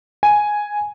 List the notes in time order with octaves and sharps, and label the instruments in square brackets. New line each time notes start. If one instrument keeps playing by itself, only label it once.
[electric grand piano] G#5